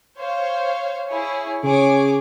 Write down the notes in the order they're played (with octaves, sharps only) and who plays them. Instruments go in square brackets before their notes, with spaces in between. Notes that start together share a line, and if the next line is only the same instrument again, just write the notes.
[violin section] C5 C#5 F5
E4 G#4 C#5
[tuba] C#3 [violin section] G#4 C#5 D6